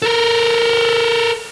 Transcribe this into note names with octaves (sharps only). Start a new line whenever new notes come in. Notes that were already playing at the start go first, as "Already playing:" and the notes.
A4 A#4